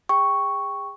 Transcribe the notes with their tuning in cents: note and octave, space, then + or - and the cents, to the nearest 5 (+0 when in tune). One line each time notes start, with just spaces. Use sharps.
G#4 -40 G5 +0 C#6 +0